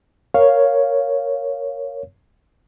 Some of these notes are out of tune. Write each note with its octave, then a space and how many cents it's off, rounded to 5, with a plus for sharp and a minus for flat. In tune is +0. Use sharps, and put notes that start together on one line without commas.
A#4 +0 C#5 +0 F5 +0